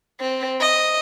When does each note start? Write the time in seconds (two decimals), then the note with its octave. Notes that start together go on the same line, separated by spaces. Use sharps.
0.20 C4
0.61 D#5